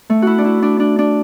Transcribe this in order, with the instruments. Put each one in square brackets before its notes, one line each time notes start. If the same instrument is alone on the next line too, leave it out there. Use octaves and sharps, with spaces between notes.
[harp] A3
E4 F#4
D4
E4
D4
D4
D4